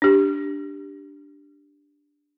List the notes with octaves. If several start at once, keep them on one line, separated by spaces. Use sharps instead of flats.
D4 G4